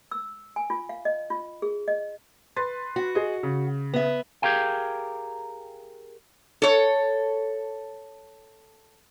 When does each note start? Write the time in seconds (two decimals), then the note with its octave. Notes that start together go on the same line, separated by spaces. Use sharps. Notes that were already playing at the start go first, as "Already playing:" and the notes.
0.11 E6
0.56 G#5
0.70 F4
0.89 F5
1.05 D#5
1.30 F4
1.62 G#4
1.88 D#5
2.56 B4 C6 A6
2.96 F#4
3.15 G#4 D#5
3.43 C#3
3.94 B3 E5
4.42 G4 G#4 A#4 F5 G5
6.62 A4 C#5